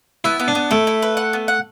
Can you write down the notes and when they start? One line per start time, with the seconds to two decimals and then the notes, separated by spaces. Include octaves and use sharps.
0.24 B3 E4
0.40 B3
0.48 D4
0.55 B3
0.71 A3 E4
0.87 E4
1.02 B4
1.17 F#5
1.33 B3
1.48 F#5